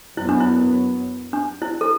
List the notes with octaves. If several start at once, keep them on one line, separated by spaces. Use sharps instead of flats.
F#2 F#3 B3 E4
D4
E4
D4
E4
A4